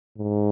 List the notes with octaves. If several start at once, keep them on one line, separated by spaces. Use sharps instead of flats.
G#2